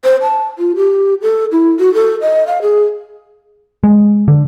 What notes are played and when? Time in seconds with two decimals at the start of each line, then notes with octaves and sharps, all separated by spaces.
0.04 C5
0.22 A5
0.59 F4
0.76 G4
1.22 A4
1.52 E4
1.79 F#4
1.94 A4
2.21 D#5
2.47 F5
2.62 G#4
3.84 G#3
4.28 D3